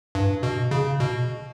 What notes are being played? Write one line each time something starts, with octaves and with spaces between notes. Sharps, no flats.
G2
B2
C#3
B2